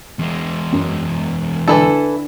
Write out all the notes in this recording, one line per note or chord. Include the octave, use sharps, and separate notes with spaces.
E2 G#3
F#2
D3 E3 E4 A4